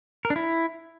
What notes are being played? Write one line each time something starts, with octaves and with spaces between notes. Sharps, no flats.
A#4
D4
E4